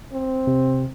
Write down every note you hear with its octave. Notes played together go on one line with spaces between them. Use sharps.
C4
C3